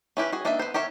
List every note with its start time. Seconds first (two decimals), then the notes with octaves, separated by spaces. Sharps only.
0.17 C#4 E4 G4 B4
0.32 F#4 G#4
0.45 A#3 D4 D#4 B4 E5
0.59 B3 B4 C5
0.74 G4 A#4 C#5 E5